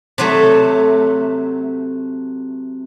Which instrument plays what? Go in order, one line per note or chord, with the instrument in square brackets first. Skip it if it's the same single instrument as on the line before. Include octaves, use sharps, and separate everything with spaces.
[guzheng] C3 F#3 A3